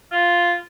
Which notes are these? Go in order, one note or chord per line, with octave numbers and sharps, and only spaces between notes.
F4